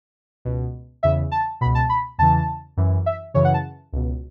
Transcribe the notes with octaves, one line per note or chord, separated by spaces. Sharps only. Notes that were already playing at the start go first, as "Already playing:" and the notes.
C#2 B2
E2 C#3 E3 E5
A5
C#2 B2 B5
A5
B5
E2 C#3 E3 A5
F#2 E3
E5
F#2 C#3 E3 C#5
F#5
A5
C#2 B2